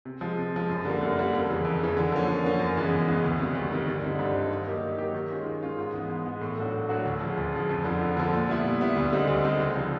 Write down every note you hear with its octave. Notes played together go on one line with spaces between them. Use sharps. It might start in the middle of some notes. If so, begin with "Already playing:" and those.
C3
F3 G#3
C3
F3 G#3
F#2
D3 G3 A#3
F#2
D3 G3 A#3
F2
C#3 E3
F2
C#3 E3
D3
F3 A#3 C#4
D3
F3 A#3 C#4
F#2
C#3 E3 G#3 B3
F#2
C#3 E3 G#3 B3
D2
C3 D#3 G3
D2
C3 D#3 G3
G2
D3 G3 C4 D#4
G2
D3 G3 C4 D#4
D#3
F#3 A#3 D#4 G4
D#3
F#3 A#3 D#4 G4
D#3
G#3 C#4 F4
D#3
G#3 C#4 F4
G#2
E3 G#3 B3
G#2
E3 G#3 B3
A2
F#3 A3 D4 F#4
A2
F#3 A3 D4 F#4
D2
C#3 F3
D2
C#3 F3
F2
D3 F3
F2
D3 F3
A#2
G3 B3 E4
A#2
G3 B3 E4
D2
D3 G3 C4 D#4
D2
D3 G3 C4 D#4
C#2
C3 F3